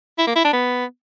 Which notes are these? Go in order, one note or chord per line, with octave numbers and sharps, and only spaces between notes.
E4
A#3
E4
D4
B3